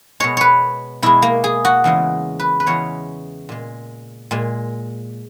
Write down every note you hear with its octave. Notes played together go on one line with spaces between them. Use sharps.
B2 G#3 C#5
B4 C#5
B2 G#3 E4
A#3
G#4
F#4
E2 C#3 E3 G#3
B4
B4
E2 C#3 E3 G#3 C#5
A#2 G#3
A#2 G#3